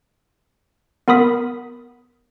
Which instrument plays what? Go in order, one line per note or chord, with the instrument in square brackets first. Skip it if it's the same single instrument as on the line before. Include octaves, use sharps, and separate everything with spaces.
[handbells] B3 A#4 B5 D#6 B6